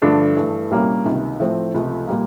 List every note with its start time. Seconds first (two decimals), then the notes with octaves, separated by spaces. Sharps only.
0.02 G2 D3 F3 A3 D4
0.36 G2 E3 A3
0.71 C2 A#2 G3 A#3 C#4
1.05 C#2 C3 D#3
1.40 A2 F3 A3 C4
1.74 C#2 C3 F3 A3
2.08 A#2 G3 A#3